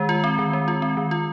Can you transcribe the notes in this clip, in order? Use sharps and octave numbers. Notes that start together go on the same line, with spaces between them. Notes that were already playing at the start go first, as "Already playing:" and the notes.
Already playing: D#3 G#3
F4
C4
D#3
G#3
F4
C4
D#3
F4